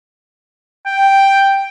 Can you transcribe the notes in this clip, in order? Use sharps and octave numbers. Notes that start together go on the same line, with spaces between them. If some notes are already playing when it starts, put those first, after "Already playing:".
G5